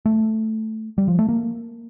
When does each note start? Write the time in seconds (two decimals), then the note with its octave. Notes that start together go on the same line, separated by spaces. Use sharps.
0.06 A3
0.98 G3
1.08 F3
1.19 A3
1.29 A#3